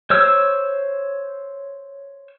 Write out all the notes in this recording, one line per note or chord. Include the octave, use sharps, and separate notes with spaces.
C5 C#5 E6